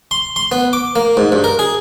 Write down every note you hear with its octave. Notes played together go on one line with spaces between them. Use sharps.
C6
C6
B3
D6
A#3
G#2
G2
A#4
G#4